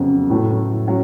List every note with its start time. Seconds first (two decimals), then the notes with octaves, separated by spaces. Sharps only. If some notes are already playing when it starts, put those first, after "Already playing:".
Already playing: F2 C#3 F#3 B3 F#4
0.30 A2 F#3 A3
0.88 F#3 C#4